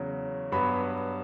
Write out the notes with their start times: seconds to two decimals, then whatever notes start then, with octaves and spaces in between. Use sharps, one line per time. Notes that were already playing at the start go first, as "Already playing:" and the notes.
Already playing: E2 C#3 F#3
0.52 G2 F#3 B3 B5